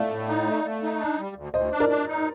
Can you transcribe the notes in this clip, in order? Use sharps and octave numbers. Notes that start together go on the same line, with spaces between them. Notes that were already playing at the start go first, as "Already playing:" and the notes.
Already playing: A3 D5 F5
A2
D#4
A3
A3
D#4
D4
G3
D2
D2 C5 D#5
D4
A#4 D5
D4
D#4